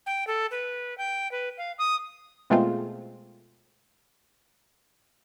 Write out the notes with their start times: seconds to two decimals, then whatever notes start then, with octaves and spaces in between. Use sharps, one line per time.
0.06 G5
0.27 A4
0.51 B4
0.98 G5
1.32 B4
1.58 F5
1.78 D#6
2.50 B2 G#3 A3 C4 F4